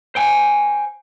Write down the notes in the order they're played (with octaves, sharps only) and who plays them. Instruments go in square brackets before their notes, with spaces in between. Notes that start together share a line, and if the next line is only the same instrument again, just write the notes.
[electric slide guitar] C5 G5 G#5